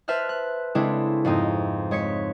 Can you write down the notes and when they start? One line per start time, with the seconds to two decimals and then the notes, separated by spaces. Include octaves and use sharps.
0.08 B4 C5 E5 A5 F6 F#6
0.29 F#6
0.75 C#3 G#3 C4 D4 E4 A4
1.25 F2 G#2 C4 D#4
1.91 G#3 C#5 B6 C#7